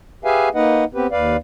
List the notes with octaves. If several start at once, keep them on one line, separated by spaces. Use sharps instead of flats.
G4 G#4 B4 E5 F5 G#5
A#3 D#4 B4 D#5 F#5
B3 C4 G4 B4
D#2 B4 D5 F5